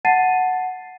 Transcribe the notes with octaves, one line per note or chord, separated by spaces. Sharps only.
F#5 A5 A6 C7 D#7